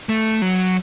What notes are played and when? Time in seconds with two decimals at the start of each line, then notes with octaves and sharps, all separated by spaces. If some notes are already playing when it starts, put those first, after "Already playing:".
0.09 A3
0.42 F#3